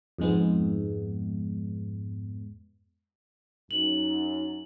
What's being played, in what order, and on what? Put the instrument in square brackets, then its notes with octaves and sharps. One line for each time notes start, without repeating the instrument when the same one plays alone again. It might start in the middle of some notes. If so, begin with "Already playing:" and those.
[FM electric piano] F2 G#2 G#3 B3
[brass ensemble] F#2 [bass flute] D#4 [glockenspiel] F#7